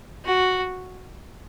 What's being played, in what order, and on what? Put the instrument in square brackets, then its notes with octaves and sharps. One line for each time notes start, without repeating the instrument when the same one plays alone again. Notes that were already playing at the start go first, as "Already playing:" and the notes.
[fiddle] F#4